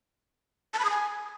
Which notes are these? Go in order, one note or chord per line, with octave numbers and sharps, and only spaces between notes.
A5
B5
D#6
G#5